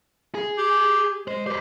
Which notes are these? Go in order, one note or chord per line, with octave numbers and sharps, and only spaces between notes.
G#4
G4
G#3 C5
G4 B4 C5